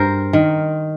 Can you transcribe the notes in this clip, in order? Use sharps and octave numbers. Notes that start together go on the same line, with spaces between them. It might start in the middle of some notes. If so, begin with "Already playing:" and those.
Already playing: G2 A#4 C5
D#3